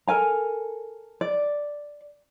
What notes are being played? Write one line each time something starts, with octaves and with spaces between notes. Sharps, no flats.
A4 A#4 G#5 A#5
D5